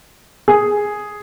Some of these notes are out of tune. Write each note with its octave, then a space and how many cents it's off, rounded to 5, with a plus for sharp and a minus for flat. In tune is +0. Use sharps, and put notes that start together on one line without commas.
G#4 +0